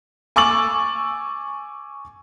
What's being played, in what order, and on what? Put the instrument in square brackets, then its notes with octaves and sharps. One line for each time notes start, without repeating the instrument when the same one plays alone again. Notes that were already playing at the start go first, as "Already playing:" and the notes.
[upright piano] G#5 C#6 D6 E6 A6 F#7